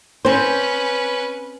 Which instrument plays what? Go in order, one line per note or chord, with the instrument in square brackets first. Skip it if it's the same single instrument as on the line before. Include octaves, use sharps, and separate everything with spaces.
[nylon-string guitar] C4 C5 [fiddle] C#4 B4